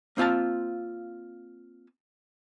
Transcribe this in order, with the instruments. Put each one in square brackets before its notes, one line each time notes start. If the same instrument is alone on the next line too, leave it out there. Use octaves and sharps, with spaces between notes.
[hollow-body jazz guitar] A#3 C4 F4 F5 A5